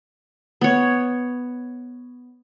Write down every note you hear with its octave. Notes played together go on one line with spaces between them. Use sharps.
B3 C#5